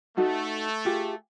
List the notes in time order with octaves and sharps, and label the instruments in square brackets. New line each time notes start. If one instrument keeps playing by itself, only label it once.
[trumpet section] A3 [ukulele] D#4 F#4 A4
[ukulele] F4 G4 G#4